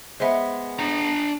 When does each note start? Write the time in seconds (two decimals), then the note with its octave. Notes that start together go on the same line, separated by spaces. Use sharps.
0.20 G#3 B3 C5 E5
0.79 D4 A#5